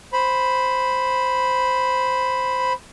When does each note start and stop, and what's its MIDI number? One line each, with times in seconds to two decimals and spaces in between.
0.13 2.73 72
0.13 2.73 83